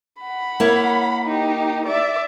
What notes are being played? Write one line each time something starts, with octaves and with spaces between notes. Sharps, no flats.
F#5 B5
A#3 E4 C#5
D#4 G4
D5 E5